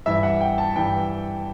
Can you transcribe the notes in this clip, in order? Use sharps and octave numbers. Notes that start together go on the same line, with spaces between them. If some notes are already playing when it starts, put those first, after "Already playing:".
G2 E3 E5
F#5
G5
A5
G2 E3 G5